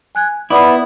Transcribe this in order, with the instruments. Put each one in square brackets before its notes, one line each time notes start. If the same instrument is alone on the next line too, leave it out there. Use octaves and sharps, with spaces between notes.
[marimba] G#5 F#6 G#6
[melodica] B3 [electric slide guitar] E4 [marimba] D5 B5 D6